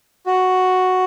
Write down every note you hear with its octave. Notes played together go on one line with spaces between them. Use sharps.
F#4